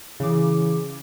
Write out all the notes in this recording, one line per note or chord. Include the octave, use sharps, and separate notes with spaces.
C#3 E3 D6